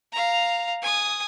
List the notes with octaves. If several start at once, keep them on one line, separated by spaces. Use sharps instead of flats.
F5 A#5
G#5 D#6